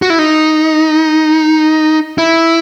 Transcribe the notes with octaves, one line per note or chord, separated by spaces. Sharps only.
F#4
E4
D#4
E4